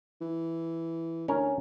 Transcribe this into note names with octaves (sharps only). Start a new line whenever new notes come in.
E3
D2 C#4 A#4